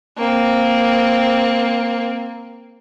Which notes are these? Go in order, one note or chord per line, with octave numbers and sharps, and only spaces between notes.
A#3 C4